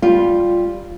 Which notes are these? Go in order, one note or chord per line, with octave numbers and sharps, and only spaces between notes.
G3 F4